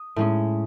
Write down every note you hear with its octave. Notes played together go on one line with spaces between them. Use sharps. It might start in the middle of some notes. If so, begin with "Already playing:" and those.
Already playing: D#6
A2 G#3 C#4